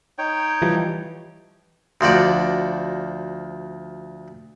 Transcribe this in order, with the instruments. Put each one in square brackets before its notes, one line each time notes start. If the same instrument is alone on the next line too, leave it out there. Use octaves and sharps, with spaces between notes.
[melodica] D#4 C#5 G5
[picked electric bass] E3 F3 G3
[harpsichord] D2 F3 F#4 D5